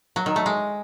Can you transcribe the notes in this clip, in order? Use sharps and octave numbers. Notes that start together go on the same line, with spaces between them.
F#3
D#3
A3
G#3